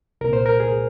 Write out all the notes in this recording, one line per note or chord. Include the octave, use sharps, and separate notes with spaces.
C2 A#2 A#4
C5
A#4
G#4